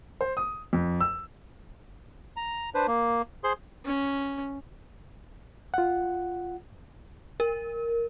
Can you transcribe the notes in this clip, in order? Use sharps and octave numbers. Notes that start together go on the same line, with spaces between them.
C5
D#6
F2
E6
A#5
D4 B4 C5
A#3
G#4 C5 C6
C#4
F4 F#5
A#4